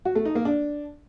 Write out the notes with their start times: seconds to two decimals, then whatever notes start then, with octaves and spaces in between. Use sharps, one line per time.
0.05 F#4
0.15 A3
0.25 D#4
0.35 A#3
0.45 D4